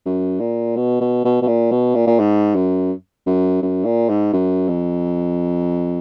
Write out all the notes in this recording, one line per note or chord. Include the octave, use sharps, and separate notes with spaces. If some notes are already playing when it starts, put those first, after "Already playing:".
F#2
A#2
B2
B2
B2
B2
A#2
B2
A#2
A#2
G#2
F#2
F#2
F#2
A#2
G#2
F#2
F2